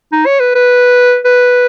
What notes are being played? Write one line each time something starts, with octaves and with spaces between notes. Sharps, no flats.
D#4
C#5
B4
B4
B4